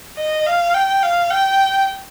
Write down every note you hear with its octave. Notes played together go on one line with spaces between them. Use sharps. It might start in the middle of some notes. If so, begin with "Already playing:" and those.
D#5
F5
G5
F5
G5